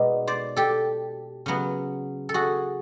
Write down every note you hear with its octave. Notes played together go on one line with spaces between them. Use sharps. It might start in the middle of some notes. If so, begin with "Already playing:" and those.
Already playing: B2 G#3 B3 D#4 D5
C5 D5
G4 A4
C#3 F#3 B3
A4
F#4 G#4